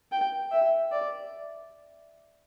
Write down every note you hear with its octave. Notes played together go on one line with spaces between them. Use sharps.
G5
E5
D5